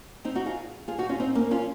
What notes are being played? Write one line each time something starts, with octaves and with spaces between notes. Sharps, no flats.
C4 D#4
D#4 F#4
F4 G#4
F4 G#4
D#4 F#4
C#4 F4
C4 D#4
A#3 C#4
C#4 F4